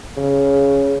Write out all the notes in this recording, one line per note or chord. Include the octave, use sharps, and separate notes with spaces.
C#3